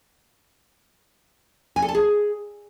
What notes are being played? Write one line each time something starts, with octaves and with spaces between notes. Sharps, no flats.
G#5
A4
A5
G#4